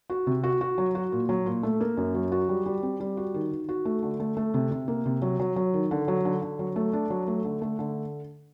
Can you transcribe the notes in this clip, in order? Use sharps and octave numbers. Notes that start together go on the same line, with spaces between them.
F#4
C3
F#4
F#4
F#3
F#4
A#2
F#3
A#2
A3
A#3
F#2
F#3
F#4
G3
G3
C4
G3
F#4
D#3
D#3
F#4
A3
D3
A3
A3
C3
C3
A#3
C3
F#3
F#3
F#3
D#3
D3
F#3
D3
D3
F#3
A3
D4
F#3
A3
D3
A3
D3